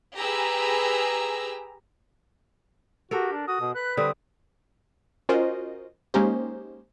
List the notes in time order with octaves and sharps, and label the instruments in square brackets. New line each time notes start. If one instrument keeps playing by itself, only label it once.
[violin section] G4 G#4 B4 A#5 E6
[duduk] F#4 [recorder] G4 [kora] A4 A#4
[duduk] D4
[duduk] F#4 [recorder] D#6
[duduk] B2
[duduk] B4 [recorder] F#6
[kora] D3 G3 C4 [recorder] D#6
[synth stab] C#4 F4 F#4 A#4 C5 D#5
G#3 A#3 C#4 D#4 G4 C5